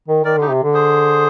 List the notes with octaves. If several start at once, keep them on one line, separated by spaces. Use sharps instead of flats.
D#3
D#3 A#4 D5
D3 D#4 G4
C3
D3
G#4 C5